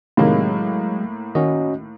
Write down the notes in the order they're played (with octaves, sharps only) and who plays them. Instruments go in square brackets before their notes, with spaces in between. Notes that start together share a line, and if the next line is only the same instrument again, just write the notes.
[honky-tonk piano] A2 A#3 [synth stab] C3 D#3 [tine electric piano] F#3 G#3
[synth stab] D#3 [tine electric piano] C#4 F#4 D#5